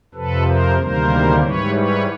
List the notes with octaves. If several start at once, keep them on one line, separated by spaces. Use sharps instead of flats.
F2 C3 F3 A4 B4
A#4 C5
D2 C3 D#3 G3 A#3 A#4 C5
G#2 E3 G3 B4 C#5
B4 C#5